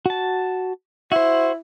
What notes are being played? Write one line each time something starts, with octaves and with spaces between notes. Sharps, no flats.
F#4 A5
E4 F#4 C5